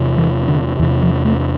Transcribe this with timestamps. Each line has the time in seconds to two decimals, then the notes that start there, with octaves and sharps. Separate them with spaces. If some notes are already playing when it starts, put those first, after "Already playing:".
Already playing: E2 C3
0.17 E3
0.48 D3
0.79 E2 E3
0.83 C3
1.02 F3
1.25 A3